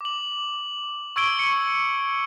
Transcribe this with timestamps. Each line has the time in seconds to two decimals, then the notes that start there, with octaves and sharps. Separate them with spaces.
0.01 D6 F#7
1.16 C#6 E6 G#6 D7 G7
1.39 C#6 C#7